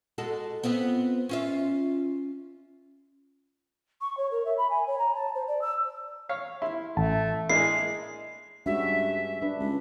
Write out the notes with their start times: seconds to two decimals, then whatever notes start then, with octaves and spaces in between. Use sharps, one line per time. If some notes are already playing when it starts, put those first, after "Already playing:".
0.18 G#3 F#4 A4
0.63 B3 C4 F4
1.29 C#4 F4 E5
4.01 C#6
4.17 C#5
4.31 A#4
4.45 E5
4.57 B5
4.70 G#5
4.87 C#5
4.98 A#5
5.15 A5
5.35 C5
5.48 D5
5.61 E6
6.29 C#5 F5
6.62 E4 C6
6.97 A1 A3 A5
7.50 G#3 A#3 D4 E4 G#4 C7
8.66 G2 G#3 C#4 F#4 E5
9.42 D4 B4
9.59 C#2